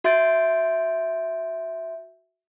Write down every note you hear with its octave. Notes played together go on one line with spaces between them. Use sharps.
F#4 E5 C6 G6 A6 D7